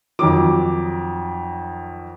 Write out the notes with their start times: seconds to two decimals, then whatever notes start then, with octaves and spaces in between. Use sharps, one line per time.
0.19 F2 D#3 F#3 D6